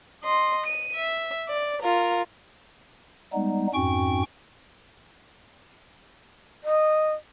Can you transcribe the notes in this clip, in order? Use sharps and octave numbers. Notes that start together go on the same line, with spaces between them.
D#5 C6
D#7
E5
D5
F4 A#4
G3 G#3 B3 D#4
F2 G#2 C#4 F#4 G5 C#6
D#5